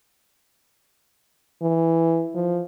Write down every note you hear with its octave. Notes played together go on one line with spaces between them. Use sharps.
E3
F3